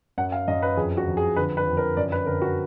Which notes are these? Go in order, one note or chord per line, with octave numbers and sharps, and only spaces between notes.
F#2 F#5
F5
F#2 D#5
B4
F2 G#4
F#4
F2
G#4
D3 B4
B4
F2
A#4
F#2 D5
B4
D3 A#4
F#4